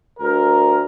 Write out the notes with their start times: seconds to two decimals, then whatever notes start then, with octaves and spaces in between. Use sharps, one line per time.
0.19 D2 A#4